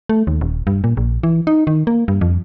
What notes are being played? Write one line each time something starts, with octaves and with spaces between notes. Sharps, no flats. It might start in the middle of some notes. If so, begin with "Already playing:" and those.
A3
D#2
D#1
G2
A#2
A#1
E3
D#4
D#3
A#3
G2
F2